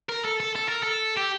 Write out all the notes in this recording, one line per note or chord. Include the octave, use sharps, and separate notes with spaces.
A#4
A4
A4
A4
A#4
A4
G4